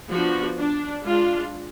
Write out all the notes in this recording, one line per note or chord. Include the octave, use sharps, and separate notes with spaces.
F3 B3 D4 F#4
D4
G#3 D4 F4